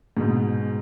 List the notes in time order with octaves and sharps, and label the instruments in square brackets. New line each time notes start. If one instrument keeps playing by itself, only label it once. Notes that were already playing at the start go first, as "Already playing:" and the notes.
[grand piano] G#2 B2